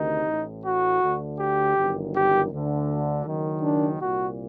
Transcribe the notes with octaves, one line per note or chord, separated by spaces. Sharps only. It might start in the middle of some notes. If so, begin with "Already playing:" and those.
Already playing: D2 C3 D#3 D#4
A1 A2
F#4
D2 D3
G4
G1 F#2 D#3
G4
D2 D3
F#1 F#2 D#3
D4
C2 A#2 F#4